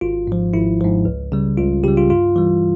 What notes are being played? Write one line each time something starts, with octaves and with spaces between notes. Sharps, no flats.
G#1 F4
G#2 F3
G#1 E4
G#2 F3
C#2
C#3 G3
C#2 F4
C#3 G3 G4
F4
G2 F4
E3 G3